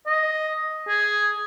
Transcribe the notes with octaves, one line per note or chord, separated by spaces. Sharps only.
D#5
G#4